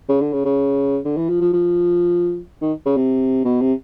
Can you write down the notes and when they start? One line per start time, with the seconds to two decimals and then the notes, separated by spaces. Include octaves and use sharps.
0.09 C#3
0.21 D3
0.33 C#3
0.45 C#3
1.05 D3
1.17 E3
1.29 F3
1.41 F3
1.53 F3
2.62 D#3
2.86 C#3
2.97 C3
3.45 B2
3.61 C3